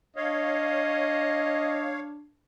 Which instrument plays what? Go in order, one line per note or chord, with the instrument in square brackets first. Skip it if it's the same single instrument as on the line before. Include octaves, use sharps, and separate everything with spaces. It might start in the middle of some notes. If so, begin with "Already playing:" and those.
[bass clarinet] D4 [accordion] C#5 F5 [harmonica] D#5